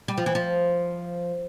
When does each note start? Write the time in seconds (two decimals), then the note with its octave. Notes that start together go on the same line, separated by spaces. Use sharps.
0.08 G3
0.18 F3
0.26 E3
0.35 F3